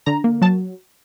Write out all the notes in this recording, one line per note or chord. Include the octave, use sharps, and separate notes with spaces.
D3 A#5
A#3
F#3 A5